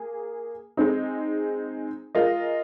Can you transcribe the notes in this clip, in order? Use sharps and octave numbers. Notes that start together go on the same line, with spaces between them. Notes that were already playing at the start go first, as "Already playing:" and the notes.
Already playing: A#3 G#4
G#3 C4 D#4
G#3 F4 A#4 D#5